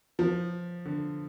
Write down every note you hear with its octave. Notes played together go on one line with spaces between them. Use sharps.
F3
D3